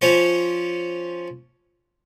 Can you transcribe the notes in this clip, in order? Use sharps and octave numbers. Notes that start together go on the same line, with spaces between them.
F3 C#4 F4 C5 C#5